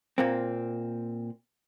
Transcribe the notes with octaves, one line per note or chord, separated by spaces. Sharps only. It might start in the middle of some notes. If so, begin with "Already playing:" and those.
A#2 A#3 C4